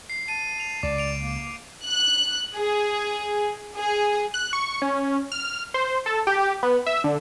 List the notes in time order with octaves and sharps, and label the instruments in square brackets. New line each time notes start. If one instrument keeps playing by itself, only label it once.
[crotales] C7
[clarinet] A5 [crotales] D#7
[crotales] F7
[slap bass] C#2 [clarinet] D5 [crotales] D6
[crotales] D7 F7
[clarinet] A#3
[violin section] F#6
G#4
G#4
[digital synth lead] F#6
C#6
C#4
F6
C5
A4
G4
B3
E5
D3